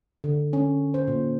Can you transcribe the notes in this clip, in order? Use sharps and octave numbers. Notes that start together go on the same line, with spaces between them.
D3
C#4
C5
A#2